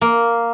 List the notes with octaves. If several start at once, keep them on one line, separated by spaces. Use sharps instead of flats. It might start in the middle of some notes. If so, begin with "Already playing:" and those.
A#3